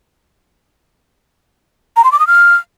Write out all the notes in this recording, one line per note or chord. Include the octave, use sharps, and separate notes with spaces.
A#5
C6
D6
D#6
F6